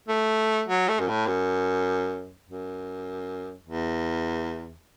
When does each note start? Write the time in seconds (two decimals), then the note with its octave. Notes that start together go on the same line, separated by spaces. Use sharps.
0.09 A3
0.68 F#3
0.89 A3
1.00 F#2
1.08 A2
1.27 F#2
2.48 F#2
3.67 E2